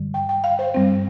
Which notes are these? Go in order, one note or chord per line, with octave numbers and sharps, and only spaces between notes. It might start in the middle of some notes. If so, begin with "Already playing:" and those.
Already playing: G2 D3 G3
G5
G5
F5
C5
G2 G3 C4